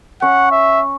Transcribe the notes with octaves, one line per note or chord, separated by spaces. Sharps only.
C#4 F#5
E5